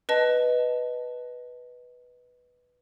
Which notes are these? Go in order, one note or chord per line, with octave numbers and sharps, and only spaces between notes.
B4 D#5 A5